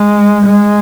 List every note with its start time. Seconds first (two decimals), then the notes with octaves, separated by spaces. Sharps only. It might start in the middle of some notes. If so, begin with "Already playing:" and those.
Already playing: G#3
0.45 G#3